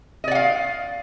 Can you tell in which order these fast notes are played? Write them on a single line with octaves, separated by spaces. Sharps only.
D#5 D5 F#5 F5